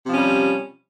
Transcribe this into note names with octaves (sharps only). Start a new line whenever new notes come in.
C3 F3 G3 C#4